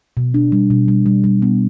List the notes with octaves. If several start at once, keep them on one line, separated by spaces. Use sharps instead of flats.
B2
D4
G3
B2
G3
G3
G3
B3